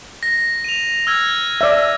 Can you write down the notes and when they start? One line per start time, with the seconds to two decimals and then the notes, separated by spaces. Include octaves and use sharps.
0.23 A#6
0.64 D#7 F7
1.07 E6 F6 G#6
1.61 D5 E5